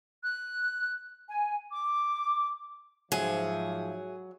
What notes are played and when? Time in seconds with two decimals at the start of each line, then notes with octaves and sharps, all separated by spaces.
0.24 F#6
1.29 G#5
1.72 D6
3.12 G#2 F3 F#3 G#4 E5